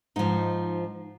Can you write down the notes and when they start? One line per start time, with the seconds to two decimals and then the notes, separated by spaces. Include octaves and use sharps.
0.16 G#2 F3 D#4